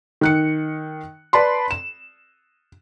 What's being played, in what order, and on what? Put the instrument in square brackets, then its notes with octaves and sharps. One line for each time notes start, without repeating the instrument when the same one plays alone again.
[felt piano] D#3 F#6 C#7
B4 D5 A5 B5 C6
E7